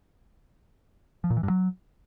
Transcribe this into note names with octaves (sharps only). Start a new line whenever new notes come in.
F3
A#2
E3
G2
F#3